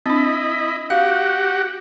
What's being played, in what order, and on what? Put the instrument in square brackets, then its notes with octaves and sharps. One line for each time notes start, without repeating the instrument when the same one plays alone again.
[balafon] C4 D4 [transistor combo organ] E4 D#5 B5
[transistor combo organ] F#4 G4 F#5 [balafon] F5